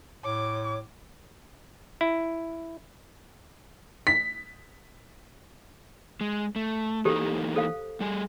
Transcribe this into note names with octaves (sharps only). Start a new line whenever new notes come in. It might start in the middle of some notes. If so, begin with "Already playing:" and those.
A2 C#5 D6
E4
B6
G#3
A3
E3 A#3 D#4 G4 A4 C5
A4 C5 F5
G3 G#4 G#5